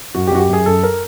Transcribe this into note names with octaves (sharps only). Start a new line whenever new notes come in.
F#2 F#4
G4
F#2 F#4
G4
F#2 G#4
F#2 A4
A#4